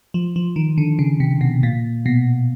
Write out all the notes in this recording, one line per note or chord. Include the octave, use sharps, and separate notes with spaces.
F3
F3
D#3
D3
C#3
C3
B2
A#2
B2